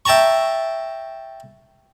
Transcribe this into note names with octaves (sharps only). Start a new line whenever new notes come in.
E5 G5 A5 A#5 C#6